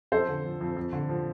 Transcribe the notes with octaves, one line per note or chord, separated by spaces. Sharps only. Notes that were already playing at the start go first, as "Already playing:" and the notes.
F2 A4 C5
D3
F3
F2
F2
D3
F3